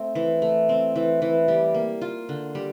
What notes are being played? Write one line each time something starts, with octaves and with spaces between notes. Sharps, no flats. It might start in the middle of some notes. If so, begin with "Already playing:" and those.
Already playing: A3 C4
E3
A3
C4
E3
E3
G3
A#3
F4
D3
G3